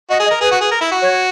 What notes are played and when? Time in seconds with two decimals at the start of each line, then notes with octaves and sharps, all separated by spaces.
0.10 F#4 D#5
0.20 G#4
0.26 D#5
0.31 A#4
0.41 G#4 B4
0.51 F#4
0.61 G#4
0.71 A#4
0.81 E4
0.92 F#4
1.02 C#5